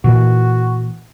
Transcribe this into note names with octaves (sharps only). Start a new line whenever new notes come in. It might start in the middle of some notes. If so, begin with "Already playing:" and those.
A#2 E3 F#4